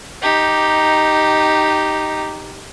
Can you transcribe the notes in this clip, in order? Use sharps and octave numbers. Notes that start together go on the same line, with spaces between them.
D#4 G4